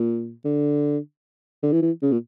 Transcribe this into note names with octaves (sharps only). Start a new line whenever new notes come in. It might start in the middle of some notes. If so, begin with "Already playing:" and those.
Already playing: A#2
D3
D3
E3
E3
C#3
A#2